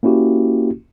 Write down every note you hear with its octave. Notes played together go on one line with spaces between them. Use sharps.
A#3 C#4 E4 F#4 G4